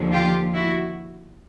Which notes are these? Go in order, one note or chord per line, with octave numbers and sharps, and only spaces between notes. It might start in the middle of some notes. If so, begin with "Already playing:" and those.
Already playing: D#2 D3 F3
F4 G4
E4 F#4